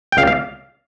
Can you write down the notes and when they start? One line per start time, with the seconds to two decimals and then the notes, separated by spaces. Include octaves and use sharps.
0.12 G5
0.17 C#2 F5
0.27 F5